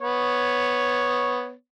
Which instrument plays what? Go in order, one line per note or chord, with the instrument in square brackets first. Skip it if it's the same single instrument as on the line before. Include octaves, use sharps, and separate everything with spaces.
[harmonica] B3 C#5